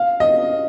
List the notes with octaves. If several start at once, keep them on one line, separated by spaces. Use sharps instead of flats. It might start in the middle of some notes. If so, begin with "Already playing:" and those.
Already playing: F5
D#5